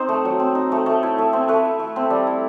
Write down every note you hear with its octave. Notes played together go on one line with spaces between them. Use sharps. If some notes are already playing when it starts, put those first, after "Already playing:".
Already playing: C4 D#4 C5
A3
F#3
C4
D#4
A3
A3
E4
A3
C4
A3 B4
E4
A3
C4
G3
E4